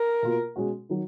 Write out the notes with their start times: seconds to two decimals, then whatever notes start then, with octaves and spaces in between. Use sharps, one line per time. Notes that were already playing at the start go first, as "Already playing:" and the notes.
Already playing: A#4
0.22 B2 A#3 F4
0.56 B2 G#3 C#4 F#4
0.89 D#3 F#3